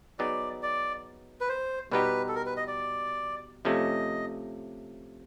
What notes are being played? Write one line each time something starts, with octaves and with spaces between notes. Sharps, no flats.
F#3 B3 D#4 G#4 D5
D5
B4
C5
B2 G3 B3 D#4 G4 B4
A4
A#4
B4
D#5
D5
C3 F3 A3 C#4 D#5